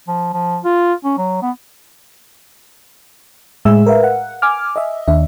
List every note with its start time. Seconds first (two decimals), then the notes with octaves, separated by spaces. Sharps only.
0.08 F3
0.34 F3
0.65 F4
1.05 C#4
1.18 F#3
1.42 B3
3.65 A2 G#3 G#4 E5 E6
3.86 A#4 B4 E5 F5
4.04 F#5
4.42 G#5 D6 F6
4.76 D#5 E5
5.08 D#2 D4 E5